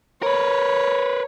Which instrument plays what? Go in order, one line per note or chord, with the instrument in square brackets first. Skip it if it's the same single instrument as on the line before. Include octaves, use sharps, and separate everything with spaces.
[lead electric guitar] A#4 B4 [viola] C#5